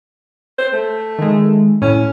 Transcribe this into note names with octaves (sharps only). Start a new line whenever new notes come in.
C5
A3
D#3 G#3
A2 C#4